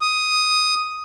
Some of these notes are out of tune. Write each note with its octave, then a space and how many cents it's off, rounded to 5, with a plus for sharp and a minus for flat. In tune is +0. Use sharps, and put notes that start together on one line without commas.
D#6 +5